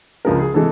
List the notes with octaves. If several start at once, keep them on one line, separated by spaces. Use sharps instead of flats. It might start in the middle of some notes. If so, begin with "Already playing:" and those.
C#2 C#3 F3 G#3 A#4
G#4
C3 E3 G#3 A4